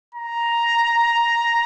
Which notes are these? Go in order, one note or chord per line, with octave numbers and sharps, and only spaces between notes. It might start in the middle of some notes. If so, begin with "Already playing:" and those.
A#5